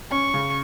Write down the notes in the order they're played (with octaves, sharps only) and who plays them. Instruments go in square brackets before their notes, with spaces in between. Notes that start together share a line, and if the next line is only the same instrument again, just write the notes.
[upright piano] C#4 [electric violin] C#6
[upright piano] C#3